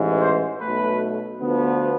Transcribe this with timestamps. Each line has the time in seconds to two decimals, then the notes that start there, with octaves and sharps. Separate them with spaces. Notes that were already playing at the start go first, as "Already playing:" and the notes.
Already playing: A1 G#2 E3
0.20 C5
0.60 B1 B2 A3 B4
1.40 D2 D3 F3 B3